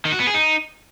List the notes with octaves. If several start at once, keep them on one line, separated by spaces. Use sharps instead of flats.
D#3
F#4
B3
G#4
D#4